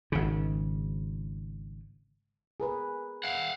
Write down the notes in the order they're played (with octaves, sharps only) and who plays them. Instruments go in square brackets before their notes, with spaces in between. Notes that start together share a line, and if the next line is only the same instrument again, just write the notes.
[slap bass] G#1 C#3
[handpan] G#4 A#4 B4
[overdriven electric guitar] F5 F#5